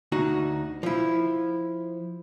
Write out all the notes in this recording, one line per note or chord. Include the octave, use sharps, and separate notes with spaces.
D2 D#4 F#4
F3 E4